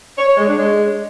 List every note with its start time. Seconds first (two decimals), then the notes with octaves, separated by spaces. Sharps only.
0.17 C#5
0.27 C#5
0.37 G#3
0.47 D4
0.57 G#3